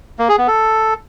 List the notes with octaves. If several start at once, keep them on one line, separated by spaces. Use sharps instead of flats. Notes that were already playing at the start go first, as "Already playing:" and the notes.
A#3
G#4
B3
A4